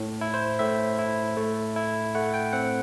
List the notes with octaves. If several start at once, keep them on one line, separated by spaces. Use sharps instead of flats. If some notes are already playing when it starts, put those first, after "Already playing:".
Already playing: A2
E4
C5
A2 E5
E4
A3
E4
A3 F#5
G5
C4 F#5